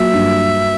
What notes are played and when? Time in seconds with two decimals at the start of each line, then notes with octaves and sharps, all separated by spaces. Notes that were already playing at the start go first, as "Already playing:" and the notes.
Already playing: F#3 A#3 E5
0.14 G2